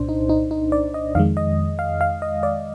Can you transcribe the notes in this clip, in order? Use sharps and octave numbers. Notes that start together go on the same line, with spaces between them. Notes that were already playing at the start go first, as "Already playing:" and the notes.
Already playing: C2 A#2 D4 C5
D#4
D#4
D#4
D5
D#5
F2 D#3 G#3 F5
D#5
F5
F5
D#5
D5